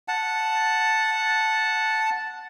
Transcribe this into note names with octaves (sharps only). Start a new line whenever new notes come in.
F#5 A5